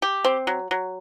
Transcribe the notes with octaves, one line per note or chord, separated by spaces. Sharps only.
G4
C4
F#3
F#3